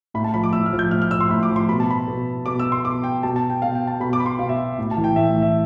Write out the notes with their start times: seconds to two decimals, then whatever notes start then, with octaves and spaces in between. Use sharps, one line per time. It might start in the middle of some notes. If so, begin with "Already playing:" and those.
0.14 A2 B5
0.24 A5
0.34 F3 B5
0.44 D6
0.53 A2 E6
0.66 F6
0.73 F3
0.79 G6
0.91 A2 F6
1.02 F6
1.11 F3 E6
1.20 C6
1.30 A2 B5
1.43 D6
1.49 F3
1.56 C6
1.68 B2 B5
1.80 A5
1.90 B5
2.08 B2
2.46 B2 D6
2.59 E6
2.72 C6
2.85 B2 D6
3.04 G5
3.23 B2 A5
3.36 A5
3.50 G5
3.62 B2 F5
3.75 G5
3.87 A5
4.00 B2 B5
4.13 D6
4.20 B5
4.26 C6
4.39 B2 F5
4.49 E5
4.78 A2
4.91 A5
4.97 E3
5.04 G5
5.16 A2 E5
5.36 E3
5.42 E5